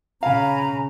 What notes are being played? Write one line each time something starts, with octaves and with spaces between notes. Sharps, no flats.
C#3 F5 G#5 A#5 B5